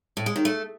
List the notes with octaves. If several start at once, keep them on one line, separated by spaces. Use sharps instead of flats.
A2
G#3
D#3
A3